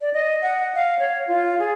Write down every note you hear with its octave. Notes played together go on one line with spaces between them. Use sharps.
D5
D#5
F#5
F5
C#5
F4
G#4